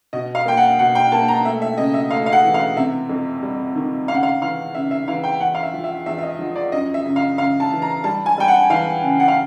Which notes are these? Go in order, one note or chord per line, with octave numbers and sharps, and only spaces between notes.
B2 D#5
F5
A#3 G5
F#5
B2 F#5
G5
A#3 A5
A#5
A3 E5
E5
C#3 D#5
E5
A3 F5
F5
F#5
E3
F5
C3 E5
F2
G3
D#3
C#3 F5
F#5
F5
E3 F5
C#3 E5
E5
E3 F5
G5
E2 F#5
F5
E5
F3
E5
E2 E5
E5
D#5
F3
D5
F#2 D#5
E5
C#3
F5
C#3 F5
A5
E3
A#5
G3 A5
G#5
G3 G5
F#5
E3 F5
C#3
F#5
F5